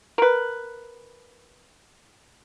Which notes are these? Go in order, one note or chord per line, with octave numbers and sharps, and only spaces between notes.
A#4 B4